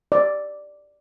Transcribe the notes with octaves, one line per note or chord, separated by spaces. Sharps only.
D5